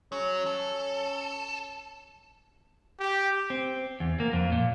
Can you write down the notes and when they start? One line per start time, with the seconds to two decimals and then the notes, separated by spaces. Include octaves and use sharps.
0.12 F#3 C#4
0.46 A4
3.00 G4
3.50 C4
4.00 E2
4.20 A#3
4.33 F2
4.52 A#2